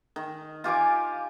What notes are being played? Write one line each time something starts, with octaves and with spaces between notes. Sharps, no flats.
D#3
F4 G4 G#5 D6